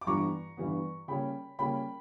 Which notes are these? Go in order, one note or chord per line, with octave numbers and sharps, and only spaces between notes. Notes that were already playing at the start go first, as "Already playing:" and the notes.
D6
G2 E3 G3 B3 A#5 C#6
G2 E3 G3 B3
C#3 G3 A#3 C#4 G5 B5
C#3 G3 A#3 C#4 G5 B5